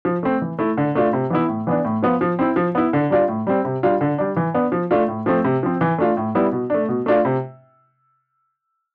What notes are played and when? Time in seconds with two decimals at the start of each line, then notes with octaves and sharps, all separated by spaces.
0.05 F3
0.23 A3 C4
0.41 E3
0.59 A3 E4
0.77 D3
0.95 A3 D4 F4
1.13 C3
1.30 E3 B3 E4
1.48 A2
1.67 E3 B3 D4
1.85 A2
2.03 F3 B3 F4
2.21 F3
2.39 C4 E4
2.56 F3
2.75 B3 E4
2.93 D3
3.10 G3 D4 F4
3.28 A2
3.47 G3 C4
3.65 C3
3.83 G3 D4 F4
4.01 D3
4.18 G3 D4
4.36 E3
4.54 B3 D4
4.72 F3
4.91 A3 D4 F4
5.08 A2
5.26 F3 A3 C4
5.44 C3
5.63 F3 C4
5.81 E3
5.98 A3 D4 F4
6.17 A2
6.35 G3 B3 E4
6.52 B2
6.70 A3 D4
6.88 B2
7.06 A3 D4 F4
7.25 C3